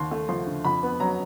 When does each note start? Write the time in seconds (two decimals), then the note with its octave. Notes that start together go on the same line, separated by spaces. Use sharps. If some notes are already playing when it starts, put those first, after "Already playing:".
Already playing: D#2 C6
0.11 A3
0.29 F3 C6
0.47 D3
0.65 F2 B5
0.83 B3
1.00 F#3 A#5